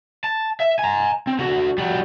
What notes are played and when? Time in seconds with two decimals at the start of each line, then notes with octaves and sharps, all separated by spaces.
0.24 A5
0.60 E5
0.79 G#5 A#5
1.27 C4
1.39 D3 F#4
1.78 G3 F#4